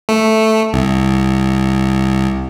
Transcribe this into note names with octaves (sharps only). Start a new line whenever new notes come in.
A3
C2